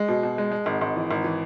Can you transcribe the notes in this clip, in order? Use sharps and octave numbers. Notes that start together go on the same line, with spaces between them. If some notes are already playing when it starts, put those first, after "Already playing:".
Already playing: G#3
B2
B2
G#3
G#3
G#1
G#1
E3
G#1
E3